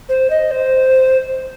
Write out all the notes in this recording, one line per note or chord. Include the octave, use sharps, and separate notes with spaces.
C5
D#5
C5